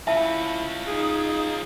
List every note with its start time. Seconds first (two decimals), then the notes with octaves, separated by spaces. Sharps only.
0.07 C#4 E4 F4 E5 A5
0.87 D#4 G#4